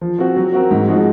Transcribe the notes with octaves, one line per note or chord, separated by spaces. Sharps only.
F3
C4 F#4
F#3
C4 F#4 A#4
G#2
F3 G#3 D#4 F#4